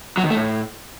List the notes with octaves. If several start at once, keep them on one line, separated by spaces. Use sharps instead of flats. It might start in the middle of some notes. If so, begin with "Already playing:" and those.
F#3
D#3
A3
A2